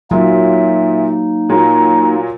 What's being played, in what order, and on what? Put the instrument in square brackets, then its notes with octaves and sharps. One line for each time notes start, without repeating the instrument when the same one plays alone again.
[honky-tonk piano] A#2 [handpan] F#3 [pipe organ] A#3 D#4 [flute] E5
[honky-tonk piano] A#2 F#3 [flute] A#5